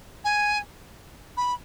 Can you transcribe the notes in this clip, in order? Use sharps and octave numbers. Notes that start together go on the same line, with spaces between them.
G#5
B5